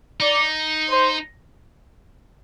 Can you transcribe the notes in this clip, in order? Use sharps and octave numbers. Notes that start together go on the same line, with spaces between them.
D#4 D5
C5